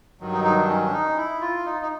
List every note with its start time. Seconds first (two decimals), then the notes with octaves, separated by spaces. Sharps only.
0.20 G2 D#3 F#3
0.33 D#4
0.44 D#4
0.56 D4
0.68 C#4
0.86 D4
0.92 D#4
1.17 E4
1.41 F4
1.65 D#4
1.82 D#4